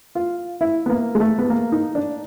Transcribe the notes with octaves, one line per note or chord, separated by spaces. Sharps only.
F4
E4
B3
A#3
G#3
A3
B3
A#3
D#4
D4